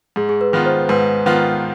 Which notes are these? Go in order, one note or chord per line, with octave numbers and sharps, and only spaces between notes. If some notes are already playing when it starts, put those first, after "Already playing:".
G#2 G#4
G#4
B4
D#3 B3 F4
C5
G#2 B4
D#3 B3 F4